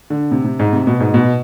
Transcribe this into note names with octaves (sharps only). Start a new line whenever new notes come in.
D3
C3
C3
G#2
C3
B2
G#2
B2